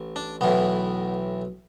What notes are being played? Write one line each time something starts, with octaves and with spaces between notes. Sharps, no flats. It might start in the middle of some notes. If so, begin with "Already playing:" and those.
Already playing: A1
D4
B1 A2 E3 B3